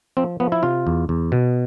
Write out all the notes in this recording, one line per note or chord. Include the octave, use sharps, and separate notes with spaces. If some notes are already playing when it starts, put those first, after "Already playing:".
F3 C4
F3 B3
E4
C3 F4
E2
E2
B2